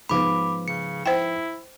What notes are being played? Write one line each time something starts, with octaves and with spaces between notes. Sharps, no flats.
G#2 F3 B3 B5 D6
C#3 C#7
E4 C5 G5